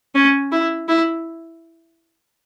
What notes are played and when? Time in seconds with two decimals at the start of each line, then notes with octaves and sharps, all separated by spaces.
0.15 C#4
0.52 E4
0.88 E4